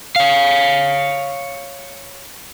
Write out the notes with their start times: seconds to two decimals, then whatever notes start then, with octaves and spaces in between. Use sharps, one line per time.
0.16 C#5 F5